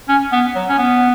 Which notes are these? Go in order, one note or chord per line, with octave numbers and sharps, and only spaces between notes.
C#4
B3
F#3
C#4
B3